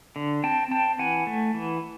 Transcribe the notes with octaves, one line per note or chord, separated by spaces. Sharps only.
D3
C4 G5 A5
C4 G5 A5
E3 F#5 G#5
A3
E3